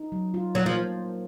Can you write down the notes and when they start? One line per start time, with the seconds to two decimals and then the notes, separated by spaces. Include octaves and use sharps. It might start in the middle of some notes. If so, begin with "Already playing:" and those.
Already playing: D#4
0.12 F#3
0.34 F4
0.55 F#3 A#3
0.66 F3